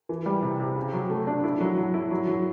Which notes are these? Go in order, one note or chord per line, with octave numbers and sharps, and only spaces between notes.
E3
G3
C3
C3
C#3
F#3
A3
D4
E4
F#3
F#3
E4
F#3
F#3